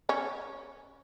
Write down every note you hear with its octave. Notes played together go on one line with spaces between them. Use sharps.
C#4